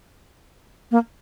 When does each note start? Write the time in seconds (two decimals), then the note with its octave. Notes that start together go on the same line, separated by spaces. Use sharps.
0.91 A#3